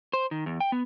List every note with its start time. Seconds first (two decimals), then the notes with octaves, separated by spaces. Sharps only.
0.13 C5
0.31 D#3
0.46 E2
0.61 G5
0.72 B3